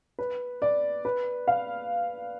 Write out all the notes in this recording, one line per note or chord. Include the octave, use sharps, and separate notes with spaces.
B4
D5
B4
F5